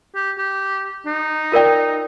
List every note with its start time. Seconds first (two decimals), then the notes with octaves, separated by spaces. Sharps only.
0.15 G4
0.38 G4
1.06 D#4
1.52 F4 A#4 D5 G5